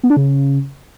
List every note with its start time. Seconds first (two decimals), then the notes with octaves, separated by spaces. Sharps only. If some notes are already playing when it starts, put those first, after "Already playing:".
0.03 B3
0.10 D4
0.17 C#3